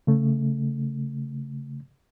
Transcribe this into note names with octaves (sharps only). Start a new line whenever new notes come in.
C#3 A3